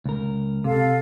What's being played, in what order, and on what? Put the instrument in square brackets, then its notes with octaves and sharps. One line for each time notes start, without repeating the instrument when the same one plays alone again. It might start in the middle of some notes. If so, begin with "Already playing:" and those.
[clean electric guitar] C#2 A#4
[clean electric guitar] C3 [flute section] A4 F5